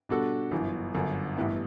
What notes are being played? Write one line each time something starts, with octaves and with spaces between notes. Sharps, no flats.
B2 G3 D4 F#4 A4
G1 F#2 E3
G1 F#2 D3
A1 G2 E3 B3 E4